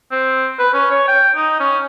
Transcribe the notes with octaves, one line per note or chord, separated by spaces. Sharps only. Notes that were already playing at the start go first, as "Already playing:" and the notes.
C4
B4
C#4
C#5
G5
D#4
C#4